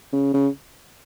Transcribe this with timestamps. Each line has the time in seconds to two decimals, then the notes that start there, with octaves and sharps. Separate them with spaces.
0.13 C#3
0.34 C#3